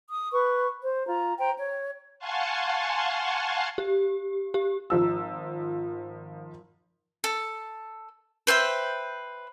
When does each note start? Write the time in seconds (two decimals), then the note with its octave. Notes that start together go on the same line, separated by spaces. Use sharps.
0.09 D#6
0.32 B4 C#6
0.82 C5
1.06 F4 A#5
1.38 C5 G5 A#5
1.58 C#5
2.19 F5 F#5 G#5 A5 C6 C#6
3.78 G4
4.54 G4
4.90 G#1 F3 E6
7.24 A4
8.47 B4 C5 E5 G5